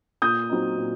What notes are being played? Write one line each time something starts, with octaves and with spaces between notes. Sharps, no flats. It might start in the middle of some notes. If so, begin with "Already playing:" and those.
A#2 D#6 G6
F#3 C4 D#4
A#2